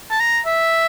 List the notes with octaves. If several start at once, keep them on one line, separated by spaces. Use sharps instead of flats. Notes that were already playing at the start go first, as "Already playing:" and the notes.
A5
A#5
E5